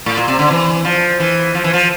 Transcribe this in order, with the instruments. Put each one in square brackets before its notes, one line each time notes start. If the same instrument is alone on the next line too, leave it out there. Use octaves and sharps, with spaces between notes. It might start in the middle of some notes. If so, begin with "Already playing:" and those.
[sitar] A2
A#2
C3
D3
E3
F3
E3
F3
E3
F3